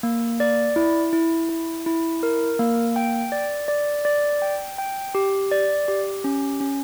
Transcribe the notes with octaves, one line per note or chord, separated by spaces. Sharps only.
A#3
D5
E4
E4
E4
E4
A#4
A#3
G5
D5
D5
D5
G5
G5
G4
D5
G4
C#4
C#4